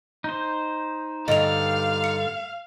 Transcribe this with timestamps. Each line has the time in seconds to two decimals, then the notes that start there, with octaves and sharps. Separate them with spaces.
0.24 D#4 C5
1.28 G2 D3 D#5 F5 F7
2.04 C#7